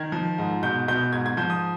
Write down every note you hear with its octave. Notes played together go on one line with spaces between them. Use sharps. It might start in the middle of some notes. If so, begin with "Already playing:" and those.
Already playing: D#3 G#6
F3
G#2
B2 G6
B2 G6
G#2 G#6
G#6
F3 G6
D#6